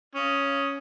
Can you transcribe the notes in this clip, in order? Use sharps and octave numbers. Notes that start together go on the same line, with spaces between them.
C#4 D#6